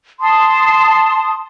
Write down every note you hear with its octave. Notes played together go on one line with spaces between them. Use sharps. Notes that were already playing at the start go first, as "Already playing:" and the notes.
A5 C6 D#6